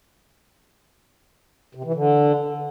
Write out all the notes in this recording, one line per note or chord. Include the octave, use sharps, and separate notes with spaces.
C3
E3
D3